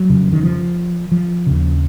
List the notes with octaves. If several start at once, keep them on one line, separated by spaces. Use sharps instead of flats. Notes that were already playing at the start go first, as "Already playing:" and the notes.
Already playing: F#3
F2 C#3
D#3
F3
F3
D#2 C#3